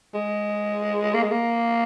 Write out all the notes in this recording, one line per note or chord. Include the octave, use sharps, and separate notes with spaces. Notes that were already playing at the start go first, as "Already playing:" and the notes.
G#3
A#3
G#3
A#3